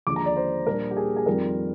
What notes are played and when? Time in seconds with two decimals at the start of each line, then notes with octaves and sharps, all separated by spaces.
0.07 D#2 D3 F3 G#3 D6
0.16 A#5
0.26 D5
0.36 C5
0.66 A#2 G3 D4 A#4
0.91 G4
0.97 G#4
1.17 G#4
1.26 F2 D#3 G3 C4 F4 A#4